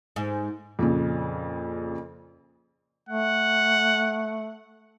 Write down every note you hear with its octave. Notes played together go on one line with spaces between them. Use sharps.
G#2
F2 A#2 C#3
A3 F#5